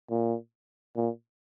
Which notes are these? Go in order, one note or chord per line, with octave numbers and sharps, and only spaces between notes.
A#2
A#2